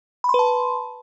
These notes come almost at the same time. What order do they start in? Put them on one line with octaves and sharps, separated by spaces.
B5 C6 B4 A5